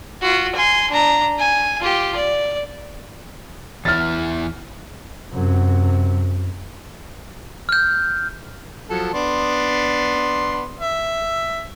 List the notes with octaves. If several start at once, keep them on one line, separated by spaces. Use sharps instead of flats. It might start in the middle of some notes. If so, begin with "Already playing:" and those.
F4 F#4
G#5 C6
D4 A#5
G#5
F4 G4
D5
E2 E4 F6 A6
F#2 C3
F6 G6
F3 F#3 A4
B3 D4 C6
E5